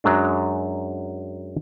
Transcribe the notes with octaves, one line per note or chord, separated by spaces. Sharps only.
F#2 F#3 G#3 D4